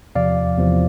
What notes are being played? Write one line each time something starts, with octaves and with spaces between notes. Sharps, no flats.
E2 C3 F3 D5 F5
E2 C3 F3